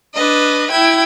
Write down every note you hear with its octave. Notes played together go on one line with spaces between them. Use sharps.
D4 B4 D#5
E4 G5 G#6